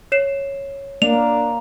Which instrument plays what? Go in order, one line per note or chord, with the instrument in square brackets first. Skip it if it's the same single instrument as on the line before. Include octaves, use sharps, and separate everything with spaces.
[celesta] C#5 C7 E7
[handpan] A#3 [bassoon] D4 [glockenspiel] F7